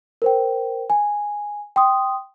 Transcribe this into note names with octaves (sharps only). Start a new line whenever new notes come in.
A#4 C5 G5
G#5
G5 C6 D#6